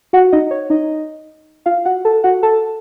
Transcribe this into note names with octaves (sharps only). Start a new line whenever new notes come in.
F#4 F#5
D#4 D#5
C#5
D#4 D#5
F4 F5
F#4 F#5
A4 A5
F#4 F#5
A4 A5